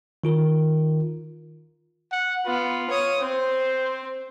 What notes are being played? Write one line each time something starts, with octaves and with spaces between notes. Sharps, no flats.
D#3 F4 A#4
F#5
B3 F4
C#5 D#6
C4 C5